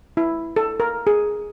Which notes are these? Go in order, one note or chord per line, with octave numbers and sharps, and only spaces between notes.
E4
A4
A#4
G#4